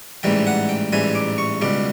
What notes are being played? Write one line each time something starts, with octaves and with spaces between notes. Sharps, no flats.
A1 G#2 E3 G3 G5
F#5
G5
A1 G#2 E3 G3 G#5
D6
C#6
C#2 B2 G3 D6